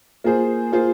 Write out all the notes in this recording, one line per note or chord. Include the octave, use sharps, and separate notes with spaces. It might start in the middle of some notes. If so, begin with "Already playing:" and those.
A#3 F4 G#4 C5
A#3 F4 G#4 C5